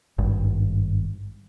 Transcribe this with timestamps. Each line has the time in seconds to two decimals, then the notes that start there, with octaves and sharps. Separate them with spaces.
0.19 G#1 G2